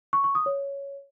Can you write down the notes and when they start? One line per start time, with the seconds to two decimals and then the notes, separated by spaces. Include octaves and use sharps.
0.13 C#6
0.24 C#6
0.35 D#6
0.46 C#5